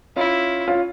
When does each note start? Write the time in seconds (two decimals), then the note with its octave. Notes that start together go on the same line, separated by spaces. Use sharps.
0.16 C#4 E4 F4
0.68 C#4 F4